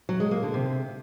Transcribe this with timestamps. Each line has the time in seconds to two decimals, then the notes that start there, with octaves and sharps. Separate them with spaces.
0.09 F#3
0.20 G#3
0.31 A#3
0.43 D3
0.54 C3